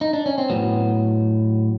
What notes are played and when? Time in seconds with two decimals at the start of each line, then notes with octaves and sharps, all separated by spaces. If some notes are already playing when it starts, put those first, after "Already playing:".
0.01 D#4
0.13 D4
0.26 C#4
0.38 C4
0.50 A2 F#3 B3